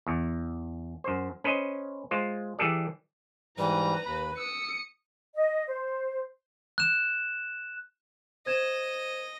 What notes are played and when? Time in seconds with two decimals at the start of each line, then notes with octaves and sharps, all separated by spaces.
0.07 E2
1.04 F#2 C5
1.44 C#4 B4 C5 D#5
2.11 G#3 F4 C5
2.59 E3 G3 G#4 A4 D5
3.58 G#2 E3 G3 B4 A#5
4.06 D#2 B5
4.37 D#6 E6 C#7
5.34 D#5
5.67 C5
6.78 F#6 E7
8.46 C5 D#5 G#6 E7